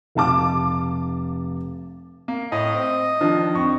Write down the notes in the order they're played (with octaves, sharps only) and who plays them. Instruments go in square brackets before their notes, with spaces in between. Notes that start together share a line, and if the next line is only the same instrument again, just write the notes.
[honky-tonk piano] F1 F5 A5 D6
[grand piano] A#3
[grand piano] A2 [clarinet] D#5
[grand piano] C4
[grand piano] D#3 F3 [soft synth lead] D4
[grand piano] F2 C#6